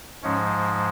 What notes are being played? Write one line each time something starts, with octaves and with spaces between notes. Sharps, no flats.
G#2 F3 G#3 C#4